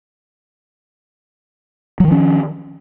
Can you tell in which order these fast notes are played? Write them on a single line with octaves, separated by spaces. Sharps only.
F#3 D#3 F3 C#4